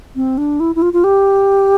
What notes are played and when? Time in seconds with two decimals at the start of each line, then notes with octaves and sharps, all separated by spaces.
0.16 C4
0.38 D4
0.60 E4
0.75 E4
0.82 F4
0.93 F4
1.04 G4